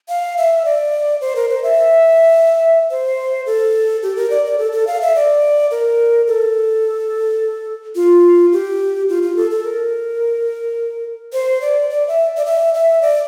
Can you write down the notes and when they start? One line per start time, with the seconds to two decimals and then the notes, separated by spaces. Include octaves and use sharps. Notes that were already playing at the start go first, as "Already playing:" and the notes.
0.09 F5
0.38 E5
0.65 D5
1.21 C5
1.36 A#4
1.49 C5
1.63 E5
2.91 C5
3.46 A4
4.03 G4
4.16 A#4
4.30 D5
4.45 D5
4.58 A4
4.72 A4
4.87 F5
5.01 E5
5.16 D5
5.71 A#4
6.27 A4
7.95 F4
8.52 G4
9.09 F4
9.23 F4
9.36 A4
9.51 A4
9.64 A#4
11.33 C5
11.61 D5
11.90 D5
12.08 E5
12.37 D5
12.45 E5
12.74 E5
13.02 D5